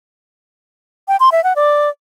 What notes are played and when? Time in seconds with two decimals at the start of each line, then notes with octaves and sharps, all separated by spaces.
1.08 G5
1.20 C6
1.32 E5
1.44 F#5
1.56 D5